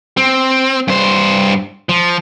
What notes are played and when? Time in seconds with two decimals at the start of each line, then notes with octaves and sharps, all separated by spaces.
0.17 C4
0.88 G2 C5
1.89 F3